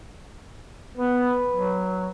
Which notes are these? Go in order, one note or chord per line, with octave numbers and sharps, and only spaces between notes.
B3 B4
F#3